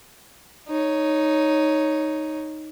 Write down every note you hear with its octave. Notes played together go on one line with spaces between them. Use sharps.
D#4 C#5